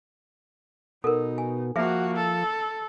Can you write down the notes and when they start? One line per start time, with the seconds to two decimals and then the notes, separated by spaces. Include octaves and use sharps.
1.04 B2 D#4 A4 A#4
1.38 G#5
1.76 F3 A#3 F#4 G#4 E5
2.16 A4